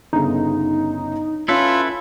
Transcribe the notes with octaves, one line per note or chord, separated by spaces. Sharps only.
G1 C#3 B3 D#4
C#4 E4 F4 A4 B4